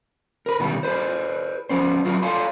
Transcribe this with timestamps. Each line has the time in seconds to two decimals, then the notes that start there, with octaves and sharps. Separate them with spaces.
0.46 A#4 B4
0.60 B2 D#3 E3 G3 B3 D#4
0.83 G#4 A4 B4 C5
1.69 F3 B3 C#4 C5
2.05 F#3 F4 F#4 G#4 B4
2.22 F4 A4 C#5 F5 G#5 C6